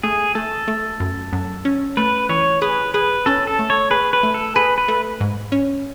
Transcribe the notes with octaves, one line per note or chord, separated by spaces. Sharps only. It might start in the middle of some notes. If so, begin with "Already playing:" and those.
A3 G#4
A3 A4
A3
F#2
F#2
C#4
A3 B4
E3 C#5
G#4 B4
G#4 B4
C#4 A4
A4
A3
C#5
G#4 B4
B4
A3
A4
G#4 B4
B4
A3
G#2
C#4